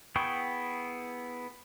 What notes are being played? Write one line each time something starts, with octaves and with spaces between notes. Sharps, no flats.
B3 E4 G#4 G5 C#6